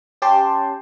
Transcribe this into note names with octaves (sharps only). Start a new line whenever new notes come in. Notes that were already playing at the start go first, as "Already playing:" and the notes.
C#4 G4 G5 A5 C6